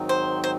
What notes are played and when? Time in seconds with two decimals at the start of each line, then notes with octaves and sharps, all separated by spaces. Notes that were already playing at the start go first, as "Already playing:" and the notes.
Already playing: G#2 D#3 F#3 C4 D#4
0.09 C5
0.44 C5